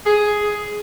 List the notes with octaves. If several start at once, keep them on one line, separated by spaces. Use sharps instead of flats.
G#4